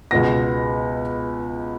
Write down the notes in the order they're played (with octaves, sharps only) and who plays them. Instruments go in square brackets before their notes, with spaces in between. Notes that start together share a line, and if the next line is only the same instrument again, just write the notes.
[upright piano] C#2 B2 G#3 B3 A#6